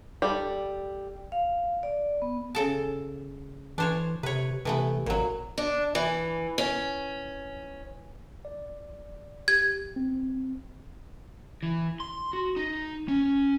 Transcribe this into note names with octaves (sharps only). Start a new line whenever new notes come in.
G3 A4
F5
D5
B3
C#3 A4 A5
E3 D4 C5 C#5
C3 B4 C#5
C3 E3 A3 B3
G#1 A#2 F#3
D4
E3
C#4
D5
G4 G#6
C4
E3
C6
F#4
D#4
C#4